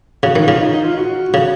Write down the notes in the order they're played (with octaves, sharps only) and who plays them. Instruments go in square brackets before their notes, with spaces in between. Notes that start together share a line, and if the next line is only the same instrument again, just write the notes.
[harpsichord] C#3 [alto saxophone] F#4
[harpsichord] D#3
[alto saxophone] F4
[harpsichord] C#3
[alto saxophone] D#4
D#4
F4
F#4
[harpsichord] C#3